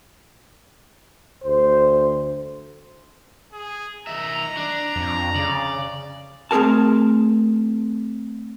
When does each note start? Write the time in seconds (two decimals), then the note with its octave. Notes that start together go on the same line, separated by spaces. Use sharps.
1.43 D2 C5
3.52 G#4
4.07 D#3 E5 A#5
4.57 D4
4.96 F2
5.36 C#3 D5
6.51 A3 C4 G#4 A#4 A5